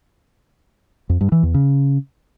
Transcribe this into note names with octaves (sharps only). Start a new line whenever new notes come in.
F2
G2
E3
E2
C#3